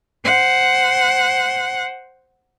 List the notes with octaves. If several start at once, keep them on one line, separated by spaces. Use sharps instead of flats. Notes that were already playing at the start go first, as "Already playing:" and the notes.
C5 F#5